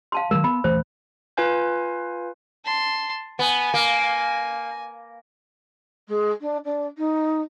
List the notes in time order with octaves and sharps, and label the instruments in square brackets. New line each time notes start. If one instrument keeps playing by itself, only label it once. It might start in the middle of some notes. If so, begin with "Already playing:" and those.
[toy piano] F5 A5 C6
[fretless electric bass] D#3 F#3 G#3 [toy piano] A#4
[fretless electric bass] B3 [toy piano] B5
[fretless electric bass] D#1 E3 A3 [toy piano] C5
[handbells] F4 B4 F5 G#5 G6
[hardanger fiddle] A5 C6
[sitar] B3 [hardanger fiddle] G#5
[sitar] A#3
[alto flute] G#3
D4
D4
D#4